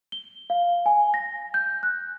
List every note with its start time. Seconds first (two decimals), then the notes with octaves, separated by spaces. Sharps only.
0.12 G7
0.50 F5
0.86 G#5
1.14 A#6
1.54 G6
1.83 F#6